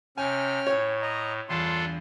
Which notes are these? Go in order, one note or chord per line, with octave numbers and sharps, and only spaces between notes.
C3 C#4 G5 G#5 F6
A2 C#5
D#5 A#5
E2 G2 D4 F4 A4 C6